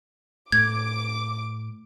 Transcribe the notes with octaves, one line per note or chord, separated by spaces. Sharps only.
A2 D6 G#6